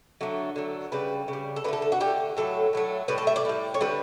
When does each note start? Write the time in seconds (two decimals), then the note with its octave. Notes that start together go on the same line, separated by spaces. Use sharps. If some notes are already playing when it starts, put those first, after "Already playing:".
0.21 D3 F#3 A3
0.56 D3 F#3 A3
0.92 C#3 G3 B4
1.28 C#3
1.33 G3
1.56 A4
1.64 D3 B4
1.68 A3 A4
1.82 A4
1.92 F#4
2.00 D3 A3 G4
2.37 A2 F#3 A3 A4
2.73 A2 F#3 A3
3.08 A2 G3 B4
3.18 A4
3.27 E5
3.36 D5
3.45 A2 G3
3.74 C#5
3.81 D3 G3 B4